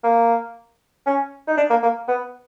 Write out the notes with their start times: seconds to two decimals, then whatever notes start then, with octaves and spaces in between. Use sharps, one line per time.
0.04 A#3
1.06 C#4
1.48 D#4
1.57 D4
1.70 A#3
1.83 A#3
2.08 B3